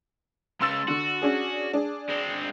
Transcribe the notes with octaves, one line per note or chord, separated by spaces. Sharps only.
C#2 C#3 C6 E6 A6
D3 F#4
C#4 D4 G#4
D4 G#4
G#3 C4